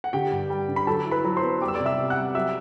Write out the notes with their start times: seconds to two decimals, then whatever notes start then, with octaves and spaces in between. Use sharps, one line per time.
0.04 F#5
0.13 D3 G4 G5
0.31 G2
0.50 G3
0.69 D3
0.76 B5
0.87 F#3 A4 A5
1.06 E4
1.11 B4 B5
1.24 F#3
1.37 C5 C6
1.43 B3
1.61 G3 D6
1.68 E6
1.75 C3 D5 D6
1.85 E5 E6
1.98 C3
2.10 F#5 F#6
2.17 G3
2.35 F#3 E5 E6